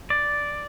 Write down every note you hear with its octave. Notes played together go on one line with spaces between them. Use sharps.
D5